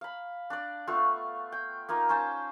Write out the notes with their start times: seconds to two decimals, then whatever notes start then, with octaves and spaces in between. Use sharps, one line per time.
0.01 F5 B5
0.50 D4 D5
0.87 A3 B3 F4 C#6
1.52 G5
1.89 A#3 D#4 F4
2.09 C#4 C5 G5 A5